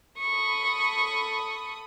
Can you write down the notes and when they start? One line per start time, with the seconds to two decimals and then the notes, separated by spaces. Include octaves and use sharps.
0.19 A4 B5 C#6 D#6